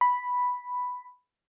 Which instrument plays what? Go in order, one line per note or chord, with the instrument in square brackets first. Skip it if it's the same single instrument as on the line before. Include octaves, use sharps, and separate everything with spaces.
[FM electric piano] B5